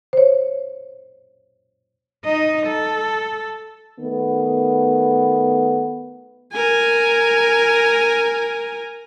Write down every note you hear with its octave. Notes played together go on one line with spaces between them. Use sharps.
C5 C#5
D#4 D#5
A4
D#3 A3 B3
A#4 G#5